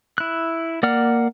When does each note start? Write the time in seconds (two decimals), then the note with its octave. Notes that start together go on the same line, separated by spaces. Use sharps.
0.18 E4 F#6
0.83 A#3 D5 F#5 F6